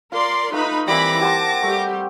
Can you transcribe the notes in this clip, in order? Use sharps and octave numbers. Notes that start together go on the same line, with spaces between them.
F4 A#4 D5 C6
A3 D#4 F4 B4 A#5 B5
E3 G3 A#3 C4 B5 D6 A#6
G4 F#5 A5 C6
G3 A3 G4